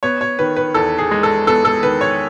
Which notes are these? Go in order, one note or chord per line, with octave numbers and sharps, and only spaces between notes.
B3 C#5
C#5
D#3 B4
B4
E2 A4
G#4
G#3
A4
B3 A4
A4
D#3 B4
C#5